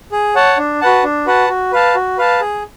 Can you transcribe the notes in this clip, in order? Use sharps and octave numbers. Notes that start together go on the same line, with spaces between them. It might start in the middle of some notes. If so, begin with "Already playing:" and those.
G#4
C#5 F#5 A5
D4
F#4 B4 F#5 A5
D4
F#4 B4 F#5 A5
F#4
B4 F5 A5
F#4
B4 F5 A5
G#4